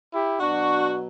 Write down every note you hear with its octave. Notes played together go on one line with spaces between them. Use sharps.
E4 G4
B2 F#3 D4 F#4